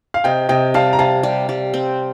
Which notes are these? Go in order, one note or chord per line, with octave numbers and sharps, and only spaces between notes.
F5
C3 D#5 G5
C3 D#5 G5
G3 F5 A5
A#5
C3 F5 A5
G3
G3
C4